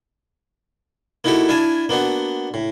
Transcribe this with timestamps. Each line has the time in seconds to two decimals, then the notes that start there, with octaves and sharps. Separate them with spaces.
1.24 A#3 D#4 E4 F#4 G4 A4
1.49 D4 E4 F5 G#5 A5
1.89 A#3 B3 D4 F#4
2.54 A2